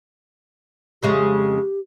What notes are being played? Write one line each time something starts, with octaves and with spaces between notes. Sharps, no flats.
F2 C#3 G#3 G4